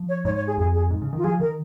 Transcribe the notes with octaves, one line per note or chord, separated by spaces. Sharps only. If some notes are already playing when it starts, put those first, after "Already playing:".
Already playing: F3
C#5
G#2 C#5
C#5
G#4
F2 G#4
G#4
G#2
C#3
D#3
F4
F3 G#4
D#3 A#4